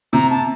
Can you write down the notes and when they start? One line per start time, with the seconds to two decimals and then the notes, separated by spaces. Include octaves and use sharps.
0.13 C3 A#5
0.30 A5